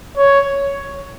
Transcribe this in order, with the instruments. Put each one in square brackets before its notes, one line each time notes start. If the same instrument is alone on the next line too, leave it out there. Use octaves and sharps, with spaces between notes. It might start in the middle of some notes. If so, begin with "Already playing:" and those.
[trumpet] C#5